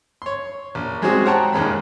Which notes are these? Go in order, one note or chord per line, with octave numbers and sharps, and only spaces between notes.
C#5 C6
A#1
G3 G#3 C4 C#4 F#4 G#4
C5 C#5 F#5 G5 A5 A#5
A#1 D#2 G#3 B5